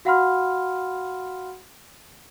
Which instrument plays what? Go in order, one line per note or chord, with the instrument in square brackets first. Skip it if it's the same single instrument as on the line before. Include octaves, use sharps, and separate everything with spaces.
[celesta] F#4 F5 F#5 B5 C6 F6